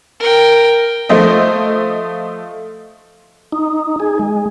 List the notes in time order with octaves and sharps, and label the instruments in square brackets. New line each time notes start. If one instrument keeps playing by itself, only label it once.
[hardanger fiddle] A#4 G5
[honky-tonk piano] F3 A3 C5 D#5
[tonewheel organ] D#4
G#4
G#3